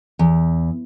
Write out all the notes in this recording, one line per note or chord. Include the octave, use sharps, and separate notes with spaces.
E2